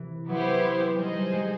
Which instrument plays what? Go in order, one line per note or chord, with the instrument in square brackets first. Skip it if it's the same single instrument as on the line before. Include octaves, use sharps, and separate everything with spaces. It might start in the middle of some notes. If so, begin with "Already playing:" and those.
Already playing: [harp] C3 E3
[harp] F#3 [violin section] B3 E4 G4 C5
[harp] G3 [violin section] D#4 G#4 C5 D#5
[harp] G3
G#3